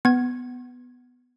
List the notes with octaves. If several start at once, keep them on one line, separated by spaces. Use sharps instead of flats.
B3 G#6